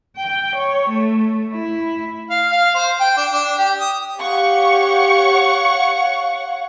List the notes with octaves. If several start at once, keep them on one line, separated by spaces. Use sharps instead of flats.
G5
C#5
A3
E4
F5
F5
C5
G5
D4
D4
G4
D#6
G4 C#5 F5 F#5 C#6